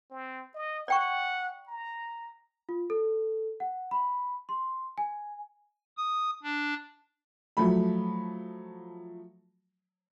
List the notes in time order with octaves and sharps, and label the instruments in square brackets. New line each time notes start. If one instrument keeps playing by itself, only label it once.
[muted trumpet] C4
D#5
[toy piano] D5 G5 C#6 [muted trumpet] F#5
[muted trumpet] A#5
[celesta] F4
A4
F#5
B5
C6
G#5
[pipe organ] D#6
D4
[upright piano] F3 F#3 A3 B5